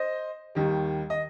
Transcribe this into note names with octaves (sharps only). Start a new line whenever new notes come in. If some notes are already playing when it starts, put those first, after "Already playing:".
Already playing: C5 D#5
D#2 D#3 G3
D#5